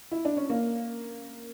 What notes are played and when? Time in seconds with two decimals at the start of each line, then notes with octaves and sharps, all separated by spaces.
0.11 E4
0.25 D4
0.37 C#4
0.49 A#3